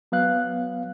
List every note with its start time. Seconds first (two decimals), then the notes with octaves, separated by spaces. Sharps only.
0.12 F#3 B3 F5 F#6